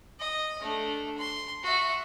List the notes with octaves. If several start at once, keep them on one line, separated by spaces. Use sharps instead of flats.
D#5
A3 D4
C6
F#4 E5